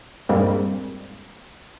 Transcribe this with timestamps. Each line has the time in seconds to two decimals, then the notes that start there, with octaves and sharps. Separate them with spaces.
0.29 G2 A#2 G3 G#3 A#3 C4